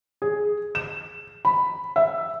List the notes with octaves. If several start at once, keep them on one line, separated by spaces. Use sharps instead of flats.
G#4
E7
B5
E5